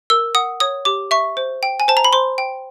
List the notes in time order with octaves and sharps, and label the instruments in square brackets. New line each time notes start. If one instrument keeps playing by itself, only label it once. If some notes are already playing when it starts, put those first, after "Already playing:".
[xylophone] A#4 E6
F#5 D#6
C#5 D#6
G4 D6
E5 C#6
C5
G5
G#5
C5 A5
A#5
B5
C5 C6
G5